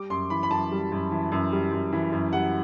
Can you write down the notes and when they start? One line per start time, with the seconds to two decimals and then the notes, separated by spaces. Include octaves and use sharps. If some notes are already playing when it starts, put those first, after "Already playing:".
Already playing: G3 D6
0.10 F#2 C6
0.30 E3 B5
0.43 B5
0.51 F#2 A5
0.71 G3
0.92 F#2
1.11 E3
1.32 F#2
1.52 G3
1.73 F#2
1.93 E3
2.12 F#2
2.33 G3 F#5